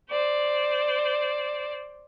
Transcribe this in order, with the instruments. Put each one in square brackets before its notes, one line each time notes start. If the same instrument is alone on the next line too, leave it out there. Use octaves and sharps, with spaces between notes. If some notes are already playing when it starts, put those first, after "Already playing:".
[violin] C5 D5